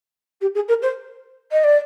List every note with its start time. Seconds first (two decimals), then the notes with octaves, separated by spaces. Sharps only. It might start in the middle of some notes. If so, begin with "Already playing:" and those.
0.41 G4
0.54 G#4
0.68 A#4
0.82 C5
1.52 D#5
1.64 D5